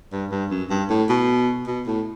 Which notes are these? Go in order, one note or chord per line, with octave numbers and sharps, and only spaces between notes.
G2
G2
F#2
G2
A2
B2
B2
A2